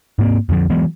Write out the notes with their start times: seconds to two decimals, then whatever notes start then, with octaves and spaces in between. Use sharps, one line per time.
0.19 G#2 A#3 C4
0.49 F2 D3 F3
0.70 E3 F#3 G#3 B3